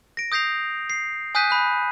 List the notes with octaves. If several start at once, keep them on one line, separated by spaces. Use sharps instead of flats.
A#6 D7
D#6 G6 A#6 C7 F7
C7
G#5 D#6 F#6 G6 B6 D#7
B5 F#6